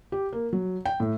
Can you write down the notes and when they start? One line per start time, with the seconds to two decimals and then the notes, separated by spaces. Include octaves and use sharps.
0.12 G4
0.33 A#3
0.53 F#3
0.86 G5
1.00 A2